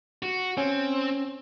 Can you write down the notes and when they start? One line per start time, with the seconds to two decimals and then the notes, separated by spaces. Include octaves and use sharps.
0.23 F#4
0.57 C4 C#4